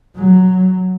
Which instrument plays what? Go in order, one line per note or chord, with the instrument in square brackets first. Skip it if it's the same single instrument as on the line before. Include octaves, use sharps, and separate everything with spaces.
[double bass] F#3